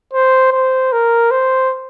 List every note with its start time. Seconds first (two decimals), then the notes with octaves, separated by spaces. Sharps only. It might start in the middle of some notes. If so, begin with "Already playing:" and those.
0.13 C5
0.53 C5
0.93 A#4
1.31 C5